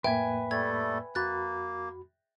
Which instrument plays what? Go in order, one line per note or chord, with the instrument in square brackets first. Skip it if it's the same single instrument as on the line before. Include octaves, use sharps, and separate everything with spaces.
[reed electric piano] F2 A2 A#3 [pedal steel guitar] B4 G#5 [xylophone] E5 G5
[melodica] G3 A3 A4 [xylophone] G#6
[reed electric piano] F2 F#4 B5 [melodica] A#3 [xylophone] F#6 A6